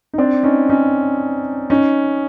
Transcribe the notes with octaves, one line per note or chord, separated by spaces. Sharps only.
D#4
C4 D4
C#4 D#4
C#4 D#4
C#4 D#4